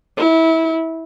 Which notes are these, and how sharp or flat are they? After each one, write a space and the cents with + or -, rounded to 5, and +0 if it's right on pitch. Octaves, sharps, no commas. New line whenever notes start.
E4 -25